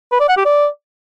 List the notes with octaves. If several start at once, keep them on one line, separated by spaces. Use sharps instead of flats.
B4
D5
F#5
G4
D5